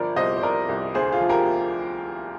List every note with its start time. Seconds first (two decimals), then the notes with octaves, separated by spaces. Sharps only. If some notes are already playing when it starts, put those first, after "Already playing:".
Already playing: G1 F3 A#4 D5
0.16 C2 C5 D#5
0.37 C5
0.43 C2 A#4 D5
0.69 C2
0.95 D2 G#4 C5
1.12 F4 G#4
1.21 F3
1.29 G4 A#4